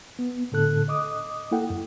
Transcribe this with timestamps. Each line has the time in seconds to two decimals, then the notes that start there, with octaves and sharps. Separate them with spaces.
0.19 B3
0.52 A2 D3 A4 F#6
0.88 D#5 D6 D#6
1.51 A#3 E4 A4 F#5 G5
1.70 F#2